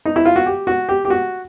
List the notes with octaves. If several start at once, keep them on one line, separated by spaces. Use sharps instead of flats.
D#4
E4
F4
F#4
G4
F#4
G4
G4
F#4